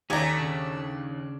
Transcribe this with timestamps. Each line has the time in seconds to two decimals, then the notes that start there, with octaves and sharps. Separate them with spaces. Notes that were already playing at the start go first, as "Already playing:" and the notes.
0.10 D#2 A3 C#4 G4 D5 G#5 A#5
0.37 C#3 D4